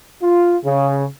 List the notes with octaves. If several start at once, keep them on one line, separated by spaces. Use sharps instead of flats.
F4
C#3